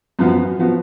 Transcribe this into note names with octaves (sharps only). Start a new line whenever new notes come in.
F#2 F3 B3 F#4
F3 B3 F#4